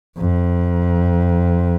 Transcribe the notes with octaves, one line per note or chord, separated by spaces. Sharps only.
F2